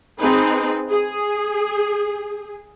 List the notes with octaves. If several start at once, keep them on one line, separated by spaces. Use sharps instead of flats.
C4 D#4 G#4 B4
G#4